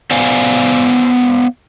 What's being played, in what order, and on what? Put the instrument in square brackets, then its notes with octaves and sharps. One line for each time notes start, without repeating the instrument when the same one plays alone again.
[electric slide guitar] B3 C5 D5 F5 G#5